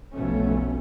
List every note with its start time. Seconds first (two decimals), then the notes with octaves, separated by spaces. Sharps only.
0.13 F1 B1 F2 B2 A3 C#4